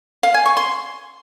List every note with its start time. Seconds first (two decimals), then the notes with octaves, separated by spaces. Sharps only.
0.23 F5
0.34 G#5
0.46 C#6
0.57 C6